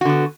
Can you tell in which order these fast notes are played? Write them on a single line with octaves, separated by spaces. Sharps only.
F#4 D3 B3